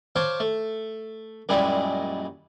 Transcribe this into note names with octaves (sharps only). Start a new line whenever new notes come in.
C5 C#5 F5 A5 C6 D6
A3
F#2 A#2 G3 G#3 E4